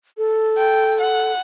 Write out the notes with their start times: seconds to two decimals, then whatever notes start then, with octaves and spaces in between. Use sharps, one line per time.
0.18 A4
0.58 G5
1.02 F#5